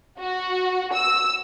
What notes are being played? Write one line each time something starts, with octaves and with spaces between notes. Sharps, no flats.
F#4
E6